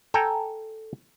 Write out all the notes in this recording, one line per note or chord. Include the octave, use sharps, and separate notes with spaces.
A4 G5 G#5 A#5